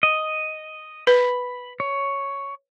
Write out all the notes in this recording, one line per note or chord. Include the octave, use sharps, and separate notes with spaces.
D#5
B4 B5
C#5